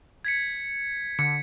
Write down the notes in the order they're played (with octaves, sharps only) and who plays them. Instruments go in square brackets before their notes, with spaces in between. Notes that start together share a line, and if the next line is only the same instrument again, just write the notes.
[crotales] G#6 B6 C#7
[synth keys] D3 [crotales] C#7